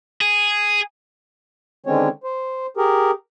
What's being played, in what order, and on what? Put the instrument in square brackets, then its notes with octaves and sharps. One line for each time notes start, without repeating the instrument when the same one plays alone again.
[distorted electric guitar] G#4
[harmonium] D3 D#3 G#3 C4 C#4 C#5
C5
G4 G#4 A#4